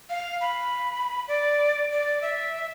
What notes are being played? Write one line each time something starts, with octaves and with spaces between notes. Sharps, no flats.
F5
B5
D5
D5
E5